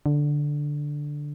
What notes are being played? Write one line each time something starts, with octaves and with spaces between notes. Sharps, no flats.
D3